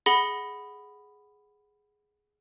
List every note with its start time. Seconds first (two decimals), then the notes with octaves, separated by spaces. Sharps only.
0.06 G#4 F#5 B5 A#6 G7